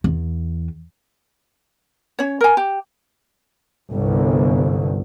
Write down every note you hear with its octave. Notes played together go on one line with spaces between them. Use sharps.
E2
C#4 C#5
A#4 G#5
G4
G1 C2